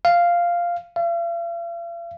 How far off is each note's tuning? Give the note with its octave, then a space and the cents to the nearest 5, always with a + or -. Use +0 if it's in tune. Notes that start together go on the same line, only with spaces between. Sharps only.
F5 -5
F5 -45